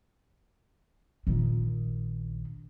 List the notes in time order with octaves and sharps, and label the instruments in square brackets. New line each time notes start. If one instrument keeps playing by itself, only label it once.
[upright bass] A#1 D#3